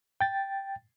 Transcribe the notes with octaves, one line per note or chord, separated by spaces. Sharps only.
G5 A6